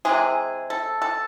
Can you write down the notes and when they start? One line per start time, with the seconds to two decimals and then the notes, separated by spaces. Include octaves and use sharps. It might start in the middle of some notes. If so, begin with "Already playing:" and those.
0.05 C3 E3 G#3 G#4
0.70 A4
1.02 A4